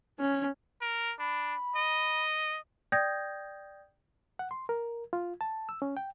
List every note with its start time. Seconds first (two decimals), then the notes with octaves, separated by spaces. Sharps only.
0.19 C#4
0.81 A#4
1.19 D4 B5
1.76 D#5
2.92 D5 G5 D#6 G6 G#6 A#6
4.39 F#5
4.51 C6
4.69 A#4
5.13 F4
5.41 A5
5.69 E6
5.82 C#4
5.97 G5